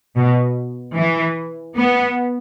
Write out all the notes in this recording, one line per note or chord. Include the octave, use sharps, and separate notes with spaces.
B2
E3
B3